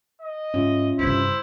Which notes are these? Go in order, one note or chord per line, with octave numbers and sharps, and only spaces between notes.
D#5
G#2 C#4 F4 E5
G2 C3 E4 C5